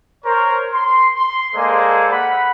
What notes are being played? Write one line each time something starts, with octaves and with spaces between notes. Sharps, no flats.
A#4 C5 C#5
C6
C6
G#3 A#3 G#4 A4 C5 D5
F#5 B5